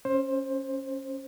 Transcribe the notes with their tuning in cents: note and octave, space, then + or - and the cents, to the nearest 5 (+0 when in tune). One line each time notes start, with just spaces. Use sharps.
C#4 -10 C5 +20